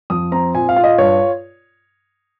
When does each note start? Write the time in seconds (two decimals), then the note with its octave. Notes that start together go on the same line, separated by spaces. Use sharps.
0.10 F2 D#6
0.32 C4 A#5
0.54 A#2 G#5
0.69 F5
0.76 F4
0.84 D#5
0.98 G2 C#5